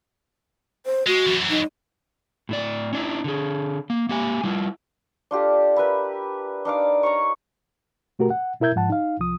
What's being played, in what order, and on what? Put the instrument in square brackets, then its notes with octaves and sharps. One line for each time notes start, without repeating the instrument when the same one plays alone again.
[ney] C5
[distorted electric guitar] G#3 [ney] F#4
[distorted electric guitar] F#2 E3
[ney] D#4
[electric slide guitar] A2 E4 D5
C#4 D4 E4
D3 G#4
A#3
A#3 G4 G#5
G3 E4 F4
[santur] D4 F4 G4 A4
A#4 B4 E5 B5
D4 D#4 F5 D6
C#5 A#5 C#6
[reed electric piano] B2 A3 F#4 G4 A#4
F#5
B2 E4 A#4 E5 G6 G#6
G#2 F3 F#5 A5
D#4 F5
C2 F3 D#6